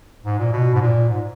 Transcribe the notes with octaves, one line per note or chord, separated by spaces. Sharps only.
G#2
A#2
B2
G#2
A#2
G#2